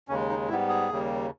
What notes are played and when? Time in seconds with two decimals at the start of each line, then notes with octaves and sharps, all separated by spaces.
0.09 D#2 C#3 G#3 C#4
0.29 D#4
0.48 G#2 G3 B3 E4
0.69 G#4
0.89 D#2 C#3 G3 A#3